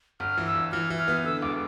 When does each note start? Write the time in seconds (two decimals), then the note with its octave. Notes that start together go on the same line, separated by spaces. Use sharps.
0.20 G1 F6
0.38 E3
0.46 E6
0.55 G1
0.72 E3 F6
0.90 E3
0.98 F6
1.08 B3
1.24 D3 E6
1.42 E1 D6